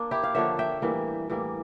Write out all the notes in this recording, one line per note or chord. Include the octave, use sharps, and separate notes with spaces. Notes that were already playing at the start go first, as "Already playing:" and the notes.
Already playing: A#3 D4
E4 G4
F5
D3 F3 A#3 D4 C#5 E5
E5 G5
A2 E3 G3 A#3
A2 E3 G3 A#3